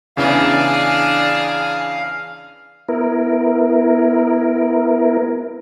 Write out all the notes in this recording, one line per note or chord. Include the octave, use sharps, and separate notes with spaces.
E2 C#3 E3 D4 G#4 F5
B3 E4 A#4